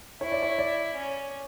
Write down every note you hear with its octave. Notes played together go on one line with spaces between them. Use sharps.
E4 C#5
D5
C#5
D5
C#4